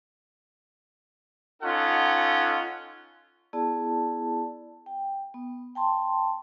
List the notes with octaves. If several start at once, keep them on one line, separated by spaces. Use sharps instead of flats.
C#4 D#4 F4 A4 F#5
B3 E4 G#4 D5 A5
G5
B3
G5 A5 C6